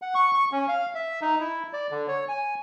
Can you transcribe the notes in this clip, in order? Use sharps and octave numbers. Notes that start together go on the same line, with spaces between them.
F#5
C#6
C#6
C#4
F5
E5
D#4
E4
D5
D3
C#5
G#5